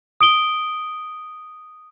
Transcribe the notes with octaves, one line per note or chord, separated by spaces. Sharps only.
D#6 D7 G7